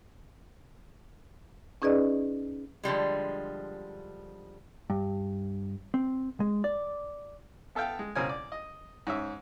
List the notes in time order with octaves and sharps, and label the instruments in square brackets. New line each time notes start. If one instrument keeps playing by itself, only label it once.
[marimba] C#4 D#4 G#4 B4 D5 D#5
[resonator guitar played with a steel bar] D3 F3 G3 G#3
[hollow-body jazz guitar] G2
C4
G#3
D5
[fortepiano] B3 A4 E5 F5 G5
G#3
C#2 B2 C4 C#4 A#4 G#5
D5
D#5
G#2 C#4 E5